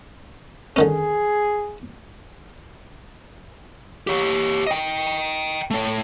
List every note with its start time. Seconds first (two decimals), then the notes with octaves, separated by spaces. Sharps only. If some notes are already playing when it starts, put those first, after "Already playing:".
0.76 D3 D#3 C#4 G#4
4.07 G4 C#5
4.67 D#5 G5
5.71 A3 C#5